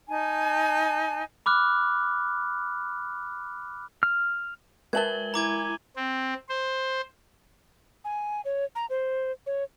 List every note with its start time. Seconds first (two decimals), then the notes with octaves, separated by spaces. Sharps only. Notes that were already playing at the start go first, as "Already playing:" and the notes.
0.08 D#4 G#5 A5
1.46 B5 D6 F6 F#6
4.03 F6
4.93 G#3 A#4 B4 E5 A5 G#6 F#7 G7
5.34 E4 G#5 A#5 D6 G#6
5.96 C4
6.49 C5
8.05 G#5
8.45 C#5
8.75 A#5
8.90 C5
9.46 C#5